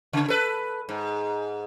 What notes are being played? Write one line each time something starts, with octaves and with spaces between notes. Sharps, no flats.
C#3
A4 B4
G#2